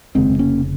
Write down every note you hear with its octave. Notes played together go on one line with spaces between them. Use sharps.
F1 D#2 C#3 G#3 C4
A#3 C#4